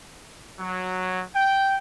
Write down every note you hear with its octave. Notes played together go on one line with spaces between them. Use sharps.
F#3
G5